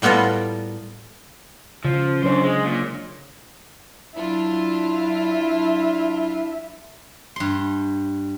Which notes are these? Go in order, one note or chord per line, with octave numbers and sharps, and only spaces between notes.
A2 G3 B3 F4 A4 A#4
C#3 F3
F#2 F#3 D4 C5 C#5
G#3
A#2
F#3 D4 E4 F4 E5
G2 C6